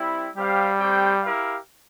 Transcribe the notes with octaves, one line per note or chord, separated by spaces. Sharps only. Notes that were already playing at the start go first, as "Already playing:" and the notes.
Already playing: G3 C4 E4
G3 C4 G4 C5 F5
A3 C4 G4 C5 G5
E4 G4 A#4 F5